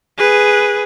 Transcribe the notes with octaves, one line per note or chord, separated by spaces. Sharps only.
G#4 B4